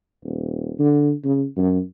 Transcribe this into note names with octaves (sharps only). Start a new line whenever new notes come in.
D#1
D3
C#3
F#2